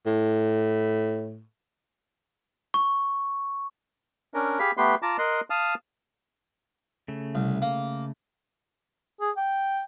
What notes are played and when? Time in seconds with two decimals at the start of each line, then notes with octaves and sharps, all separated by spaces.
0.06 A2
2.74 C#6
4.34 C#4 D4 A#4
4.59 G4 G#4 F5 B5
4.77 A3 B3 G4 B4 C6
5.02 F4 A5 A#5 D6
5.19 A#4 D#5 C6 F#6
5.50 F5 A5 D#6 F6
7.08 C#3 A3
7.35 C2
7.62 A#3
9.20 G#4
9.37 G5